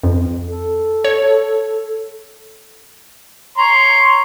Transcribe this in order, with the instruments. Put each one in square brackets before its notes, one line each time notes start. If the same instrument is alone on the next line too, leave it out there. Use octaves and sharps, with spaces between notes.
[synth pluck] F2
[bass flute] A4
[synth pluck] C#5
[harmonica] C#5 A#5 C6